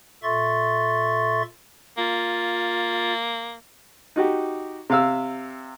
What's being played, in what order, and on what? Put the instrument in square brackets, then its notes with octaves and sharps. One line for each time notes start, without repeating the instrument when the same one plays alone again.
[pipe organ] A#2 A4 E5 C6 C#6 A6
[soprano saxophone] A#3 [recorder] F4
[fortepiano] D#4 F#4 G4
C3 F5 E6